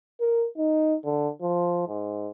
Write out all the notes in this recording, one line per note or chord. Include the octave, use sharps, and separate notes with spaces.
A#4
D#4
D3
F3
G#2